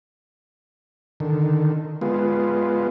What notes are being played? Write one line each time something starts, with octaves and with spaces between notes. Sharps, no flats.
D3 D#3
G#3 B3 F4